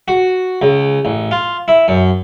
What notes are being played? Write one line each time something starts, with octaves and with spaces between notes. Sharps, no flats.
F#4
C#2
A1
F4
E4
F#2